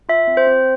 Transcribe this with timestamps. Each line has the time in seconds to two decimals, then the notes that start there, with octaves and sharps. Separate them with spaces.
0.09 F4 E5
0.27 C4
0.37 C5
0.47 C4